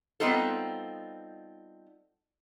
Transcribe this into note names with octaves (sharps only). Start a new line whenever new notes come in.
G3 B3 C4 D#4 F4 A4